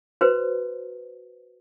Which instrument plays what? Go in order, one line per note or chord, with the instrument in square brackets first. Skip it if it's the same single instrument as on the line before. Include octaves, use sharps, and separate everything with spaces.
[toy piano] F#4 B4 C5